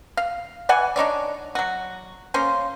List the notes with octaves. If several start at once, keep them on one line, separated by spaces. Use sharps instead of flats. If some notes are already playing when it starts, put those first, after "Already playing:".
F5
E3 D5 F#5 G#5
D4 D#4 C#5 D5
F#3 F#4
A#3 C#4 F4 C5